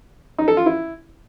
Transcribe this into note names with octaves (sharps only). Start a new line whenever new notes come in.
D#4
A4
F4
E4